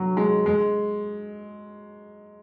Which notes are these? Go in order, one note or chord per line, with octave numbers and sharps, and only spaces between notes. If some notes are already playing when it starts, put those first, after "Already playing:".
Already playing: F#3
G#3
G#3